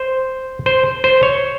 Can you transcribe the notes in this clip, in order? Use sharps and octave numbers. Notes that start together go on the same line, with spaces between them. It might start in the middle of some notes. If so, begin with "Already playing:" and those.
Already playing: C5
C5
C5
C#5